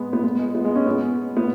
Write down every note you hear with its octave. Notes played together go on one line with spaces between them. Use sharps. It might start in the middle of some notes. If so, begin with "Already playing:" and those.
Already playing: G#3 B3
B3
B3
G#3
B3
G#3
C#4
B3
B3